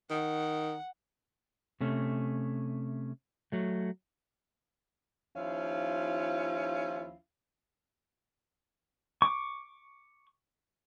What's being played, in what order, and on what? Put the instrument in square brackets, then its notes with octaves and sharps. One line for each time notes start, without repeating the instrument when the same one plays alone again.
[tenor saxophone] D#3 [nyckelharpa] F#5
[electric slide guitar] C3 A3 C#4
F#3 A3
[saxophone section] D#2 F3 C#4 E4 F4 F5
[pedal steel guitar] C#6 D6